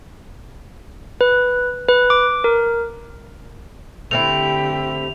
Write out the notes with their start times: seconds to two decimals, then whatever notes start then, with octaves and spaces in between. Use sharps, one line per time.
1.21 B4
1.89 B4
2.10 D6
2.44 A#4
4.11 D3 A3 C4 E4 G4 F7